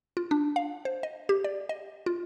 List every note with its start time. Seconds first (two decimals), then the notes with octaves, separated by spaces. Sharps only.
0.17 F4
0.31 D4
0.56 F5
0.85 C5
1.03 D#5
1.29 G4
1.44 D5
1.69 D#5
2.06 F4